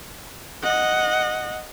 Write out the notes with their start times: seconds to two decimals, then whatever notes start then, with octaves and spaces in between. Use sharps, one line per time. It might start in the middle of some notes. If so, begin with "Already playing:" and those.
0.63 D#5 F#5